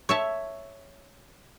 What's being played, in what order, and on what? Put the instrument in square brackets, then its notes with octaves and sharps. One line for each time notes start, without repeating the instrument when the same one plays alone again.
[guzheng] C#5 E5 A5